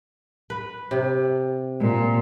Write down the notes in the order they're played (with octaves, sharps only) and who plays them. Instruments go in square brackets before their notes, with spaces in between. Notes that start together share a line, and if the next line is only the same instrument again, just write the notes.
[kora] B4
C3
[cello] A#2